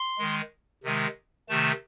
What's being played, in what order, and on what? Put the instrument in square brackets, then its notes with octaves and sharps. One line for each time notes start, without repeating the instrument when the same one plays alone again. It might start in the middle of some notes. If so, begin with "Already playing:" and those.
Already playing: [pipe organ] C6
D#3 G#3
C3 D#3 G#3
C3 D#3 A3 A5